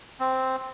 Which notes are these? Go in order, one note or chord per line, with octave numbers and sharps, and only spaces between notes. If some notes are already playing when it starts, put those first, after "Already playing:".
C4